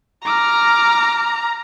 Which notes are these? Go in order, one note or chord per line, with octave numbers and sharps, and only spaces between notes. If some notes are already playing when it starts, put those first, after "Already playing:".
A#5 D6 F6